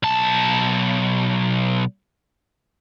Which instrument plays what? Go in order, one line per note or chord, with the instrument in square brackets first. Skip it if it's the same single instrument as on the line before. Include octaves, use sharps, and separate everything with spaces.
[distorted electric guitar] B1 A5